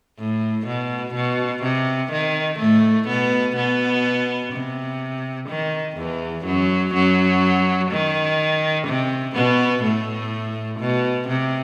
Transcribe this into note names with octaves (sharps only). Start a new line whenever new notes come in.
A2
B2
B2
C3
D#3
A2 A3
B2 B3
B2 B3
C3
D#3
E2 E3
F#2 F#3
F#2 F#3
D#3
C3
B2 B3
A2 A3
B2
C3